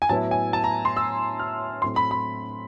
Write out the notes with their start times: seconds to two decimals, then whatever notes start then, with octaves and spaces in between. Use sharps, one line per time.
0.02 G#5
0.09 A2 F#3 B3 E4 A5
0.31 G#5
0.53 A5
0.64 A#5
0.85 C6
0.97 E6
1.40 F6
1.82 A2 F#3 A3 C4 C6
1.96 B5
2.11 B5